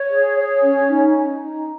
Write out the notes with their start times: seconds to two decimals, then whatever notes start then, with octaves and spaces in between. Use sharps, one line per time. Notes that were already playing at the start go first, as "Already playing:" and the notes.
Already playing: C#5
0.10 G#4
0.37 C#5
0.63 C#4
0.89 D#4
1.16 D#4
1.41 D#4